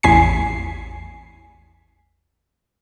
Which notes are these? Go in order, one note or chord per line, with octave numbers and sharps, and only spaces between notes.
A1 E2 G#5 B6 C7